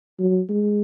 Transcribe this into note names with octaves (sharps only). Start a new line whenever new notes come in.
F#3
G#3